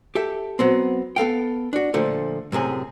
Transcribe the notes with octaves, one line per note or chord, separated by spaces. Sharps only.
G4 A4 E5
F#3 B3 C4
B3 A4 F5 G5
D4 F#4
A#2 D3 F3 A3
F#2 A2 C3 G#4